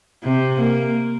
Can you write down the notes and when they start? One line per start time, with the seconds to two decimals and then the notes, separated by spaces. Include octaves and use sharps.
0.24 C3
0.59 A#3